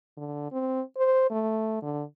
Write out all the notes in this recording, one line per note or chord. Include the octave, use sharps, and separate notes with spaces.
D3
C4
C5
A3
D3